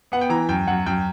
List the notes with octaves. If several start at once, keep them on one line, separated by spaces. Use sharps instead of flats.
B3 F#5
G5
E3 A#5
F#2 G5
F#2 F#5
F#2 G5